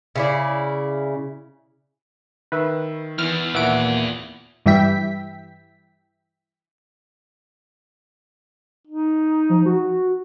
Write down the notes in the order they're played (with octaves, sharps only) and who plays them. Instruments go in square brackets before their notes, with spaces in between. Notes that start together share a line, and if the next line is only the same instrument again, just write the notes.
[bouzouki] C#3 E4 D5
[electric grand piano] D#3 E5 E6 [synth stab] B4
[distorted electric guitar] E2 [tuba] E3 [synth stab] F6
[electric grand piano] D#2 E3 [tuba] A#2 [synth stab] E5 F#5 D7
[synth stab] G2 E3 G3 E5 G5 B6
[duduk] D#4
[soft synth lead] F3
F#4